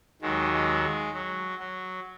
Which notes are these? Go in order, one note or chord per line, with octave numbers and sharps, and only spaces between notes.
D#2 D#3 F#3 G#3
G#3
G#3
F#3
F#3